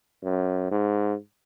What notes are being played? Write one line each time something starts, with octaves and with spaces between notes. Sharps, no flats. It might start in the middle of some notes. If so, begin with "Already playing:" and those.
F#2
G#2